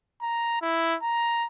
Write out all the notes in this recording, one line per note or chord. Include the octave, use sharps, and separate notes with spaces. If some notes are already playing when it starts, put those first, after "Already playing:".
A#5
E4
A#5